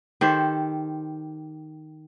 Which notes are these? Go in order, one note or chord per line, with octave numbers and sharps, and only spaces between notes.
D#3 G4 A4 C5